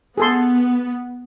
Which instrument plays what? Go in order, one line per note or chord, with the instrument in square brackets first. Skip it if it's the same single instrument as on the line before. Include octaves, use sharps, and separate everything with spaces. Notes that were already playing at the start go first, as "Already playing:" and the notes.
[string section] B3 [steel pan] G#4 A4 C6